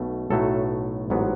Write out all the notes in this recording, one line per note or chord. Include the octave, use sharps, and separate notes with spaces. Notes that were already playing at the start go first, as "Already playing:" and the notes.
Already playing: B1 B2 A3
B1 A2 F#3 A3 A4
A1 G#2 F#3 B3